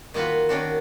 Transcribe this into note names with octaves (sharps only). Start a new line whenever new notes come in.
D#3 A#3 F4 F#4 B4
D#3 C#4 D4 F#4